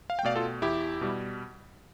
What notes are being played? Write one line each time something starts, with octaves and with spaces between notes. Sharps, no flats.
F5
G5
B2 A3 D5 F5
F4 A4
E2 E4 G4
B2 G3